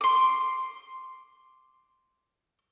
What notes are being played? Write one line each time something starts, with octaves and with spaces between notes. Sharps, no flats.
C6 D6